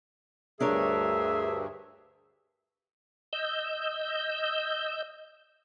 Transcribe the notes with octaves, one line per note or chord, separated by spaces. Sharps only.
D2 G2 D4 G#4 A#4 C#5 E5
D#5 E6 G6